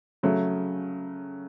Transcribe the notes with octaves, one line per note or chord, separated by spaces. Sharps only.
C#3 F#3 A3